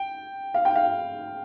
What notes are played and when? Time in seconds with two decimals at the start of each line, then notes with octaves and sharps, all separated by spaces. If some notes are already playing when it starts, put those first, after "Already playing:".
Already playing: G5
0.54 F5
0.65 G5
0.76 F5